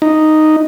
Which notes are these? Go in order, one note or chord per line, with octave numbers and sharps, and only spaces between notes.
D#4